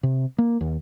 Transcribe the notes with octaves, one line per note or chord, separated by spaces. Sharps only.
C3
A#3
D#2